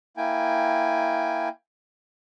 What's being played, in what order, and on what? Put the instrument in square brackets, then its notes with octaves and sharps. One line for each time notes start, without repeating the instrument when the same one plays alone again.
[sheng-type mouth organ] A#3 E4 G5 G#5